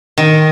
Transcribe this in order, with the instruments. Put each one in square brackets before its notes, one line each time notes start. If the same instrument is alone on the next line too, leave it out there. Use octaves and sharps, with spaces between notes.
[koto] D#3